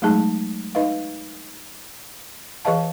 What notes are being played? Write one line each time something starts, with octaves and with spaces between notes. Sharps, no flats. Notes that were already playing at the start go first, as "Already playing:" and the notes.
F#3 G#3 A3 D#4 G#4 A5
D#4 B4 D#5 F5
E3 G#4 B4 D#5 F5 A5